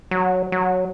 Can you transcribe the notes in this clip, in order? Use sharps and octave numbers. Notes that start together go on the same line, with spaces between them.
F#3
F#3